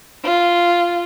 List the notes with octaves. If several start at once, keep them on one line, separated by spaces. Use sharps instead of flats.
F4